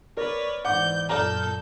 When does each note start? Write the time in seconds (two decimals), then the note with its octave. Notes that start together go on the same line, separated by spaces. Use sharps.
0.17 A#4 B4 C#5 D5
0.65 G#2 E3 F#5 D6 G6
1.09 F#2 A#2 A4 D5 A#5 F6 G6